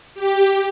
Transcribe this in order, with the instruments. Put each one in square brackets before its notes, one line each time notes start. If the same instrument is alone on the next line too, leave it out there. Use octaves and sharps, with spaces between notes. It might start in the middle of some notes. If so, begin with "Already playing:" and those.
[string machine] G4